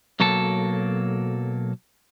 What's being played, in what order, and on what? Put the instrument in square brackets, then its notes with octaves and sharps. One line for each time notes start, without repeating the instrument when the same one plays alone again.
[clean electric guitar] B1 F#3 A#3 A4 A5